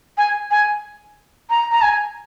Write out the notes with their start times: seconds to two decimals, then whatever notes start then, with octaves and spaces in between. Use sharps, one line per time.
0.18 G#5
0.51 G#5
1.50 A#5
1.72 A#5
1.82 G#5